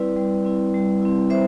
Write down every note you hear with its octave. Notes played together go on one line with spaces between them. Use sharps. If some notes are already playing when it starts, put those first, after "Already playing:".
Already playing: G3 C4 E4 B4 D5
G3
C4 E4
G3
C4 E4
G3 C5 E5